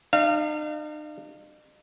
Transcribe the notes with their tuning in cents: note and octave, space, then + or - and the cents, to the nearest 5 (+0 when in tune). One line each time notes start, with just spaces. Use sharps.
D#4 -45 F5 -30